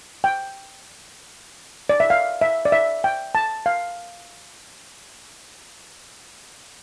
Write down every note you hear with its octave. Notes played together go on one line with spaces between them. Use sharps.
G5
D5
E5
F5
E5
D5
E5
G5
A5
F5